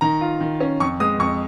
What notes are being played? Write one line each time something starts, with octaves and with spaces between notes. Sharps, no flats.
D#3 A#5
F4
D#3
C#4
F2 C#6
G#3 D#6
F2 C#6